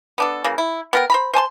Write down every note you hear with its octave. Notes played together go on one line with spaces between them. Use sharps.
B3 D4 A4
C#3 E3 A#3
E4
B3 A#4 G5
C5 A#5 B5
C5 G#5 A5 C6